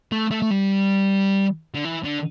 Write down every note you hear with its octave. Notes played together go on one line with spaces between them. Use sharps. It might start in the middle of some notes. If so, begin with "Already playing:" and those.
A3
A3
A3
G3
D3
E3
D3